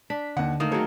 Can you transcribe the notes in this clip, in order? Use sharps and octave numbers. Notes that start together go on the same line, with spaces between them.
D4 B6
D#2 D3 F#5
D#3 A3 A#3 D#6
F#3 A3 G#4 A#4 C#5